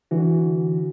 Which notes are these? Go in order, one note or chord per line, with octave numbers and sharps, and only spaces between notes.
D3 E3 F#4